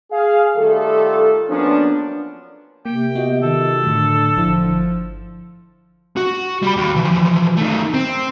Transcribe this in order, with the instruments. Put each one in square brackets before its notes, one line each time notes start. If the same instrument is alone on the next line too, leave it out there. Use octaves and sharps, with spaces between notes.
[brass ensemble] G#4 F5
D#3 G3 A3 F4 A4
F3 F#3 A#3 B3 C#4 D4
[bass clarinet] C3 [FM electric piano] A#3 [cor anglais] G5
[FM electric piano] B3 F4 F#4 [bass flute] D#5
[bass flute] D#3 [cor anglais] A4
[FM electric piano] A2 F#3 A3 [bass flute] D3
[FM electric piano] G1 E4 [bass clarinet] F3
[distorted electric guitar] F#4
G3 B5
D#2
E3 F3
D#3 A3
C4